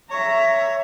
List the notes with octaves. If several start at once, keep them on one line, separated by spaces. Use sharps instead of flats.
C#5 E5 A#5